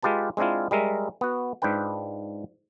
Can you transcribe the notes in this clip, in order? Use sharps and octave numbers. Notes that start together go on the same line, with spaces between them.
G#3 F4 G4 B4 A5
G#3 C4 D4 E4 F4
G3 G#3 A#4 E5
B3 F#4
G#2 D4 F4 B4 G5